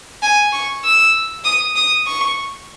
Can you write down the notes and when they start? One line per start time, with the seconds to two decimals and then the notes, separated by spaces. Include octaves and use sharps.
0.23 G#5
0.53 C#6
0.84 E6
1.44 D#6
1.76 D#6
2.07 C#6